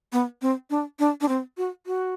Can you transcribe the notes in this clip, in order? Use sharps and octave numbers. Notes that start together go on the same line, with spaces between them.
B3
C4
D4
D4
D4
C4
F#4
F#4